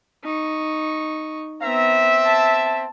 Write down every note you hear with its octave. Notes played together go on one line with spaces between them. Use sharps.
D#4 C#6
B3 C4 E5 A#5
A5